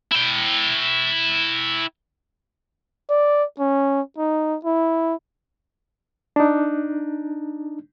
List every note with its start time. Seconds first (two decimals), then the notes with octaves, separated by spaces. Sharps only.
0.12 E4 G5
3.10 D5
3.59 C#4
4.17 D#4
4.65 E4
6.36 D4 D#4